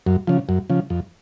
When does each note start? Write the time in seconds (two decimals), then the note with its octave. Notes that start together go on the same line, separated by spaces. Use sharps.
0.07 F#2
0.27 C#3 F3
0.49 F#2
0.70 C#3 F3
0.90 F2